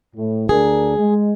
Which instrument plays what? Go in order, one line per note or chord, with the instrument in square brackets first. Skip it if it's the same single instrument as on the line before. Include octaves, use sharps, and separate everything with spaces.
[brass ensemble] A2
[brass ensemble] D2 D4 A#4 [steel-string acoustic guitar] G#4
[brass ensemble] G#3